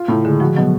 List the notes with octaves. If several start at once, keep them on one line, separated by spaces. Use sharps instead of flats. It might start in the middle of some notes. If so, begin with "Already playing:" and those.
Already playing: F4
A2 C#3
D3 G#3
F3 F#4
B2 F#3